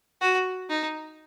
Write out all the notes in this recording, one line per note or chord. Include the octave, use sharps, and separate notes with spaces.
F#4
D#4